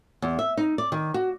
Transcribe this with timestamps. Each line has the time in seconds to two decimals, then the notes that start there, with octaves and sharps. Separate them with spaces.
0.22 E2
0.39 E5
0.57 D#4
0.78 D5
0.92 D#3
1.14 F#4